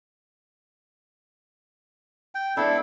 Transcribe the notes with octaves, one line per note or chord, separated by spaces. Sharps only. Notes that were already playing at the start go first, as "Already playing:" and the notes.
G5
G#3 B3 D4 E4 A4